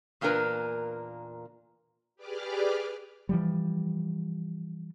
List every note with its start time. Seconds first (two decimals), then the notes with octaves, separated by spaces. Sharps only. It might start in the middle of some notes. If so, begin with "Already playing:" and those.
0.21 E2 A#2 A#3 D4 A#4 B4
2.16 G4 G#4 B4 D5 D6 F6
3.29 E3 F3 G3